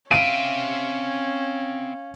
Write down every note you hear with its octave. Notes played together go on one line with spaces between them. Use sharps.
C4 C#4 E5 F5 D7 D#7